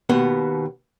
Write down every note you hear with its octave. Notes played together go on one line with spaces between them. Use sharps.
D#2 B2 B3